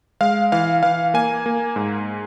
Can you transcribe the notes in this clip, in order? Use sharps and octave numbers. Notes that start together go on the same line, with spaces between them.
G#3 F5
E3 F5
E3 F5
A#3 G#5
A#3
G#2